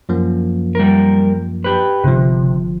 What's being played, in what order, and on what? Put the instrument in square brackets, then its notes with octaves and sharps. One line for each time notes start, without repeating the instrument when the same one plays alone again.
[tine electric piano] F#2 F3 A#3
[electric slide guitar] G3 A#4
G4 B4
[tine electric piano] G1 F3 [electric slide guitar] C3